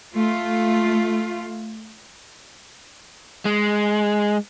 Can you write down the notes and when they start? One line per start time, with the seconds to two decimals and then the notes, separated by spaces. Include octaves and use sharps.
0.15 A3 F4
3.45 G#3